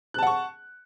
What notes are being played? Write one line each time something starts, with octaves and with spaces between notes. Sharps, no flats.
F#5 A5 C#6 F#6